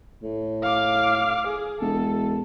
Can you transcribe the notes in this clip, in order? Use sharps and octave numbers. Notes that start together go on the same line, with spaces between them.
A2
F5 D6
G#4
E1 A4